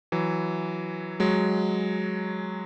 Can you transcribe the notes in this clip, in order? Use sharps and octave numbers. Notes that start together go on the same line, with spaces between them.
E3 F#3
F#3 G#3